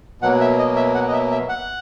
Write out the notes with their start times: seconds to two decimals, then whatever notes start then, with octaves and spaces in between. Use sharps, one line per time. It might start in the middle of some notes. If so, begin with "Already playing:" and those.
0.21 B2 F#3 A#3 F#5
0.40 E5
0.58 D#5
0.76 E5
0.94 F#5
1.08 D#5
1.13 E5
1.31 E5
1.49 F#5